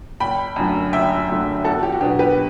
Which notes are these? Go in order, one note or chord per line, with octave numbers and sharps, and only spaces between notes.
F#1 G5 B5
F#2 D3 F#3 A3
F#1 E5 G5
F#2 D3 F#3 A3
E2 F#4 A4
G4
F#4
B2 F#3 B3 D4 G4
G4 B4